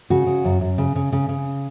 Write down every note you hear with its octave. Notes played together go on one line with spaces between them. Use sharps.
C#3 F#4
C#3
F#2
F#2
C#3
C#3
C#3
C#3